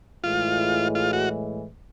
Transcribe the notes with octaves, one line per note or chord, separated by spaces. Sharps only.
A2 E3 G#3 F4
F4
F#4